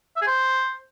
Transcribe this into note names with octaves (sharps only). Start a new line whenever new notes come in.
E5
G#4
C5